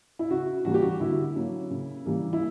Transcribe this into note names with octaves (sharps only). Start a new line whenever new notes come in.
E4
C#3 F#4
E3 G3 A#3 F#4
G4
F#4
D3 E4
F#3 A#3 C#4
C#3
E3 G3 A#3
E4